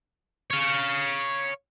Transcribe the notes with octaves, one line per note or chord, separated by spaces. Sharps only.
C#5 F5